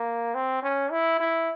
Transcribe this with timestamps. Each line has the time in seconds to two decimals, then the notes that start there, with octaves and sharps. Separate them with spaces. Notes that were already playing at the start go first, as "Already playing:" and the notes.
Already playing: A#3
0.35 C4
0.63 C#4
0.91 E4
1.20 E4